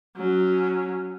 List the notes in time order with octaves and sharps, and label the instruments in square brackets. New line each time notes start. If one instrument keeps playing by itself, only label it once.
[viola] F#3 C#4